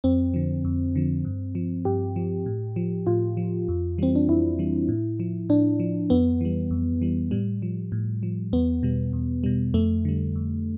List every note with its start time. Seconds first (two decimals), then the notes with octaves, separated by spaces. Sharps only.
0.04 F2 C4
0.34 D3 F3
0.65 F2
0.95 D3 F3
1.25 G2
1.55 F3
1.85 G2 G4
2.16 F3
2.46 A2
2.76 F3
3.07 A2 F4
3.37 F3
3.68 F2
3.98 E3 G3 C4
4.15 D4
4.29 F2 E4
4.59 E3 G3
4.88 A2
5.20 F3
5.49 A2 D4
5.80 F3
6.10 F2 B3
6.41 E3 G3
6.71 F2
7.02 E3 G3
7.31 A2 G3
7.62 F3
7.92 A2
8.23 F3
8.53 E2 B3
8.83 B2 G3
9.13 E2
9.44 B2 G3
9.74 F2 A3
10.05 D3 G3
10.35 F2